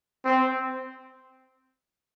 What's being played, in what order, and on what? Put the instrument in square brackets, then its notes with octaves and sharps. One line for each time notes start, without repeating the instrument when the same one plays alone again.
[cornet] C4